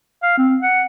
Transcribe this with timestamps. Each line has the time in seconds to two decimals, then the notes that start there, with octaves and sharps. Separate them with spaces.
0.23 F5
0.38 C4
0.62 F#5